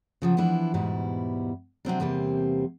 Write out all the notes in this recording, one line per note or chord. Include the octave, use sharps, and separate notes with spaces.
C#3 F3 F#3
E3 F3 B3 D4 E4
E2 G#2 B2 G3 E4
C3 F#3 C4 D4
E2 C3 G3 A#3 C4